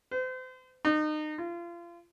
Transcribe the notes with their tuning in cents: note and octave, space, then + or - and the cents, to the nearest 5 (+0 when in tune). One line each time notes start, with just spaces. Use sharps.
C5 -35
D#4 -30
F4 -30